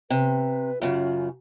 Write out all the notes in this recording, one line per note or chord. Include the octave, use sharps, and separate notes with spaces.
C3 B4
F#2 C#3 F4